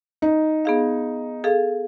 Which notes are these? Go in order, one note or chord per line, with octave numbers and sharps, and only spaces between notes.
D#4
B3 G#4 F5
G#4 A4 F5